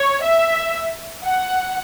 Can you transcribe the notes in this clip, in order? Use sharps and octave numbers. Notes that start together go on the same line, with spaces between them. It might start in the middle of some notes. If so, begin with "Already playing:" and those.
Already playing: C#5
E5
F#5